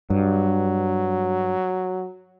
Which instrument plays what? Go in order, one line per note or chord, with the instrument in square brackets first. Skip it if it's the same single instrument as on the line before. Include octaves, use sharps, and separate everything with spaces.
[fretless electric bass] G2 [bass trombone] F#3